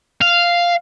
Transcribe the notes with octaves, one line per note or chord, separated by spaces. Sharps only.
F5